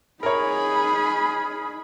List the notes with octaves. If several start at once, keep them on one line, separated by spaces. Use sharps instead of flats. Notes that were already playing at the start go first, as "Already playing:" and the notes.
D#4 G#4 A#4 C#5 B5